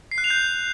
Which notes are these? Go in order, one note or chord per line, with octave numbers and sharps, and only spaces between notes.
C7
F#6
F7
G6